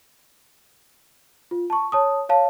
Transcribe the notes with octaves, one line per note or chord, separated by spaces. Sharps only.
F4
A5 C#6
C#5 A5 D#6
C#5 F5 A5